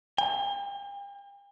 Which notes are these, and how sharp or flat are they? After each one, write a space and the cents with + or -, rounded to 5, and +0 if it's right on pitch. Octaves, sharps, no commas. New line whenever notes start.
G5 +40